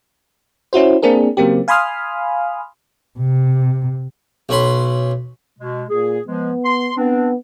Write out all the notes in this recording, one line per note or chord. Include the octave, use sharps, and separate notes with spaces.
C#4 E4 F#4 C5
A#3 C4 D4 G#4 A#4
C#3 F#3 A#3 C4 G4
F5 G#5 B5 C6 D#6 F6
C3
B1 C#4 B5 C6
B2 G#3
A#2 G#4
F3 G#3 B3
C6
B3 C4 D4